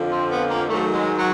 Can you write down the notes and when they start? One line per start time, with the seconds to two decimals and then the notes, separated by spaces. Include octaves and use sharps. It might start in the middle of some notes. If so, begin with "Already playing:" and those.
Already playing: F2 D3 F3
0.10 C4
0.30 B3
0.48 A#3
0.67 G#2 D#3 F#3 A3
0.93 G#3
1.18 F#3